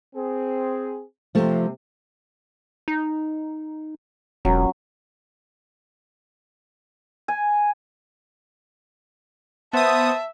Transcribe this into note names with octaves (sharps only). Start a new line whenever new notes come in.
C4 G#4
C3 F3 A3
D#4
E1 F#3 C#4
G#5
B3 C5 E5 A5 D#6